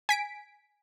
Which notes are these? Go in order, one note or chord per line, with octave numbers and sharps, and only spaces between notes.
G#5 B6 D7